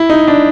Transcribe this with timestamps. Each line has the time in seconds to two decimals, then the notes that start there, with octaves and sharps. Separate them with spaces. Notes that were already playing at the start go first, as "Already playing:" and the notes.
Already playing: E4
0.10 D#4
0.28 D4